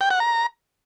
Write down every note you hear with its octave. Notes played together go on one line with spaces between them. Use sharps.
G5
F#5
A#5